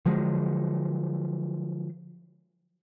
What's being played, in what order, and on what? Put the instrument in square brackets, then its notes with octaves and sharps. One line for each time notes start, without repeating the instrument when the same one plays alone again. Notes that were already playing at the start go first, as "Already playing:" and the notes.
[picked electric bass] D3 F3 F#3 G#3